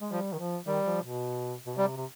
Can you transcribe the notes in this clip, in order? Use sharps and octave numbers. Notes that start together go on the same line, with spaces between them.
G#3
F3 G3
D#3
F3
D#3 G3
F3
B2
B2
C3 G3
C3